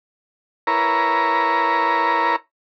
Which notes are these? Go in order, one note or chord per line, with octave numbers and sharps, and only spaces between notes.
E4 A#4 B4 C#5 A#5